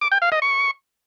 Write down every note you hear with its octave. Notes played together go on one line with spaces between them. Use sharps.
D6
G5
F5
D#5
C#6